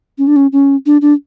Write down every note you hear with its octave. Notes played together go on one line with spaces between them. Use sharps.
C#4
D4
C#4
C#4
D4
D4